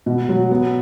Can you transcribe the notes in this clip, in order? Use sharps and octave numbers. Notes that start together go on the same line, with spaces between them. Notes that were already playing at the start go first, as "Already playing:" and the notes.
B2
F#3
B3